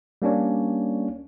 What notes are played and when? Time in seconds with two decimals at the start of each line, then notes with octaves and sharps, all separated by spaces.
0.22 G3 A#3 C#4 D4 C#5